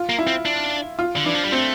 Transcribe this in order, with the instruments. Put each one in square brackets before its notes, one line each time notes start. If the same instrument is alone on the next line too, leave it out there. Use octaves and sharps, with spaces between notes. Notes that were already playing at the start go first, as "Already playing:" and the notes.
Already playing: [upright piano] F4
[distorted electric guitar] A#3
[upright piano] E4
[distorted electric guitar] C4
D4
[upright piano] F4
[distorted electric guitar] D3
[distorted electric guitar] E3 [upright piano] D4
[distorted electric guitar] F3
G3
[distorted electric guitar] A3 [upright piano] C4